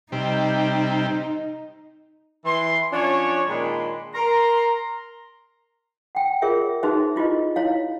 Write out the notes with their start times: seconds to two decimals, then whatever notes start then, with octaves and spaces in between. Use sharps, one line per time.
0.12 C3 G3 D#4
2.45 E3 C6
2.92 F3 C#4 D4 C#5
3.47 A#2 D#3 G#3 D4 B5 C6
4.15 A#4 A#5 C6
6.15 F#5 G5
6.42 F4 G#4 A#4 C#5 E5
6.83 D#4 F#4 G#4 B4 C5 E5
7.16 E4 F4 G4 B4 D#5
7.56 E4 C#5 F5